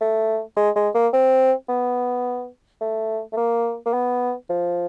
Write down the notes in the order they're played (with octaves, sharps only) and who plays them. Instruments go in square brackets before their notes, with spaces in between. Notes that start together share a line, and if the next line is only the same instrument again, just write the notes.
[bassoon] A3
G#3
G#3
A#3
C4
B3
A3
A3
A#3
A#3
B3
F3